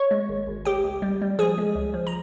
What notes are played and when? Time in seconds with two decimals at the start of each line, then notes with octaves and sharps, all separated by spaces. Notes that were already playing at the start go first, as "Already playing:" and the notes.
Already playing: C#5 C#6
0.11 G#3
0.29 G#1
0.47 G#1
0.65 C#2 G4 G5
0.84 C#2
1.02 G3
1.22 G3
1.39 F3 G#4 G#5
1.58 G#3
1.75 C#2
1.94 F3
2.07 A#5